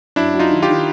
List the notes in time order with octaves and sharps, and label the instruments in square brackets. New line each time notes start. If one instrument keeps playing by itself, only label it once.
[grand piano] F#2 [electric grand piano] D4 E4
[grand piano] F#3
[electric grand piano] D#4 F4
[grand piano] D#3
[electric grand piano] F4 G4
[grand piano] D#3